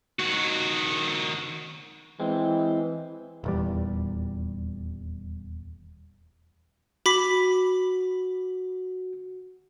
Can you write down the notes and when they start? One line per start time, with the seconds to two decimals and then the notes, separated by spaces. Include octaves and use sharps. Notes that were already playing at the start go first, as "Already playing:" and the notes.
0.19 D#3 F#4
2.20 E3 G#3 C4
3.44 D#1 E2 G3
7.06 F#4 B5 D6 B6